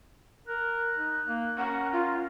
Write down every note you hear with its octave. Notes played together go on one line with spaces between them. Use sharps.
A#4 F#6
D#4
A#3
C#4 A#4 F#5
F4